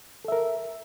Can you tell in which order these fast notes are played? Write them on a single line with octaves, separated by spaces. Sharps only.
A4 E5 A#4